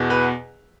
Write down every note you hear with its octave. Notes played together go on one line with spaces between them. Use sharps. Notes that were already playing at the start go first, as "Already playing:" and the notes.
Already playing: E2 B2
B4